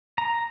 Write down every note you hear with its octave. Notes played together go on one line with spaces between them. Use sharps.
A#5